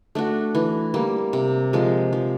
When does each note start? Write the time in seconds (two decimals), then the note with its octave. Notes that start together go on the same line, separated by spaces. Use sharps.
0.15 A3 D4 F#4
0.55 E3
0.94 G3 A#3
1.33 C3
1.73 F3 G#3
2.13 F3